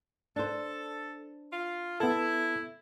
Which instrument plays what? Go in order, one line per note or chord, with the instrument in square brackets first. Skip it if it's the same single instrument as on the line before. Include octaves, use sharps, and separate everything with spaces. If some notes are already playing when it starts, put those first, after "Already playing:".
[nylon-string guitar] D4 C5 [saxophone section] A4
[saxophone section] F4
[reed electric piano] B3 A4 [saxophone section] E4